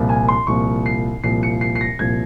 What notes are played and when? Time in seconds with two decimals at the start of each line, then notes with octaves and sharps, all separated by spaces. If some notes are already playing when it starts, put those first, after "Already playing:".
Already playing: C2 A#2 F3
0.09 G#5
0.28 C6
0.47 C2 A#2 F3 C#6
0.86 C7
1.24 C2 A#2 F3 C7
1.43 C#7
1.61 C7
1.76 C7
1.81 A#6
1.99 C2 A#2 F3 G#6